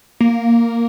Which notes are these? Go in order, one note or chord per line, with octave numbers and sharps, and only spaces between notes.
A#3